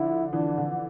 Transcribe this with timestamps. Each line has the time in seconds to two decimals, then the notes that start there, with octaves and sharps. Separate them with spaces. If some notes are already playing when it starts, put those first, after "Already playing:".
Already playing: D3 F3 E4
0.33 E3 D4
0.58 D3